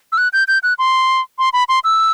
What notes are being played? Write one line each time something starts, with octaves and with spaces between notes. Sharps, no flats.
E6
F#6
G6
G6
F#6
C6
C6
B5
C6
E6